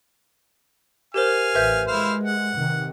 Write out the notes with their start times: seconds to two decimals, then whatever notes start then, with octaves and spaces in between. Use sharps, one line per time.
1.14 G4 A#4 C5 F5 G#5
1.55 A1 B4 E5 G6
1.88 G#3 E4 C5 F5
2.24 F#5
2.56 C3 D#3